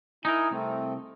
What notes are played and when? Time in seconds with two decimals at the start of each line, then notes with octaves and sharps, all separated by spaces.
0.25 D#4 E4 A#4 G#5
0.51 C2 A3 C4